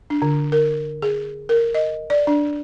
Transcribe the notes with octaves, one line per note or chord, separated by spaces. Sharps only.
D4
D3
A#4
G#4
A#4
D#5
D5
D4